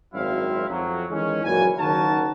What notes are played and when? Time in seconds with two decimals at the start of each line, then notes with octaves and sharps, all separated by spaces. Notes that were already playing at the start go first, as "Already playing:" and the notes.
0.13 G#1 F#2 F#3 C4 E4 F5
0.68 F2 F#3
1.10 D#3 E3 G#3 C#4
1.43 F#1 F#2 A#2 E3 G#5
1.77 F#1 D#3 F#3 F#4 A#4 A5